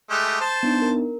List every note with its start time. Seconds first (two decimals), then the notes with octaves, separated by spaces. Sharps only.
0.10 G#3 A3 G4
0.41 C5 A5
0.63 B3 D4 D#4
0.82 A#4